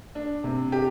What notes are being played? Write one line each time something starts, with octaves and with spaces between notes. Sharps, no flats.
D4
C3
G4